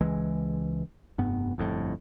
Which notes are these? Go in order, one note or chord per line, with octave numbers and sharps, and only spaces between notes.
C#2 E3 G#3
F1 G2 B3
G1 F2 A2